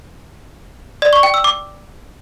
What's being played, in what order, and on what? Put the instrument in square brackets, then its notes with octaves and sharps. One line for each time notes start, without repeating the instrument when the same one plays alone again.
[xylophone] D5
C#6
G5
E6
D6